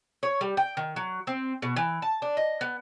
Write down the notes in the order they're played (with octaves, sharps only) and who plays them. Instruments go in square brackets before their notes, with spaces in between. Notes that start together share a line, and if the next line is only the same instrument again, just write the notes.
[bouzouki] C#5
G3
G5
D#3
F#3
C4
B2
E3
A5
D4
D#5
B3